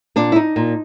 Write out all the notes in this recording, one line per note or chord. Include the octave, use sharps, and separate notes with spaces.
A#2 D4
E4
D#4
A#2